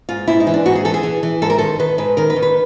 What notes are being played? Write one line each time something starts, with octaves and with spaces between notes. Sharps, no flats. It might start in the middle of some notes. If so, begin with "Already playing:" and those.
G#2 F4
G#2 E4
D#4
E3
D4
G#2 F#4
G#4
E3 A4
G#4
E3
E3
G#2 A4
A#4
D#3 A4
D#3 B4
G#2 B4
D#3 A#4
B4
D#3
B4